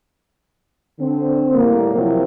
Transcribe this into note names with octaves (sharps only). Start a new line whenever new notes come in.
D3 C4
A2 G3 A#3
C3 F3 F#3 E4 A#4